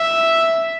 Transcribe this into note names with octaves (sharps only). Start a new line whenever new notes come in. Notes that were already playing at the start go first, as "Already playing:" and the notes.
Already playing: E5